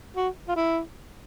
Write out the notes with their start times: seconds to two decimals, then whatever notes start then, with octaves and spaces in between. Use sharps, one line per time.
0.16 F#4
0.48 F4
0.56 E4